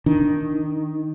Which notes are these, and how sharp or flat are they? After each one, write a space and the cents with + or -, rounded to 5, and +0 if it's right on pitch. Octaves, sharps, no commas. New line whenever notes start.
D#3 +0 D4 +0